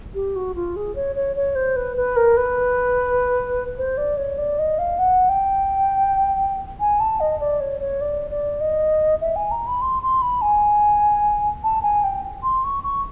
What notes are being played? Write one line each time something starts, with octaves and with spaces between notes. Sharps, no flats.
G4
F#4
F4
G#4
C#5
C#5
C#5
C5
B4
B4
A#4
B4
C5
D5
C#5
D5
D#5
F5
F#5
G5
G#5
A5
D#5
D5
C#5
C#5
D5
D5
D#5
E5
G#5
A#5
B5
C6
C6
B5
G#5
A5
G#5
G5
C6
C#6
C#6